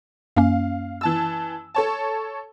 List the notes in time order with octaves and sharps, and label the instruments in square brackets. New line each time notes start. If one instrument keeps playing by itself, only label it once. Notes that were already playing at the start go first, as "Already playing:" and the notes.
[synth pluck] F#2 A#3 C#4 [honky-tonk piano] F5
[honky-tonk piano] E3 A5 E6
A4 C#5 A5